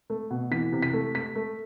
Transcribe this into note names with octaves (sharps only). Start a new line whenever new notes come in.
A3
B2
E3 B6
C3
B6
A3
A3 B6
A3